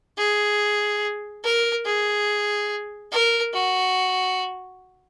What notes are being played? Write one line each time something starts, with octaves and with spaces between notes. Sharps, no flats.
G#4
A#4
G#4
A#4
F#4